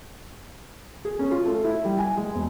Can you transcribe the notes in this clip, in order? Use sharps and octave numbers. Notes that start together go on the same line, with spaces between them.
G#4
C#4
F4
A3
E4
G3
G#5
G#3
E1